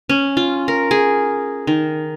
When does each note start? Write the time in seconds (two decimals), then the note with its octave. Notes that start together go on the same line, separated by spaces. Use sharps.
0.09 C#4
0.37 F4
0.68 A#4
0.91 G#4
1.67 D#3